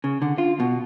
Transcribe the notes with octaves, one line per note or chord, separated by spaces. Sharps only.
C#3
D3
F4
B2